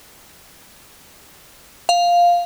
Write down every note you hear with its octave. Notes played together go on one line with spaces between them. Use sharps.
F5